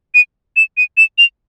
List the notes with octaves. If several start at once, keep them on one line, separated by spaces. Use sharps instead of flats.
D#7
E7
D#7
E7
F7